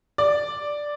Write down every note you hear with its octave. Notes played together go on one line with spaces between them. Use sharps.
D5